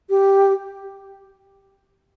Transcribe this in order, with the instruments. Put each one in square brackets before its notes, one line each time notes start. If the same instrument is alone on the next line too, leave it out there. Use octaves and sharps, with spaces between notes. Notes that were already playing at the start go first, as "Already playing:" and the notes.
[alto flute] G4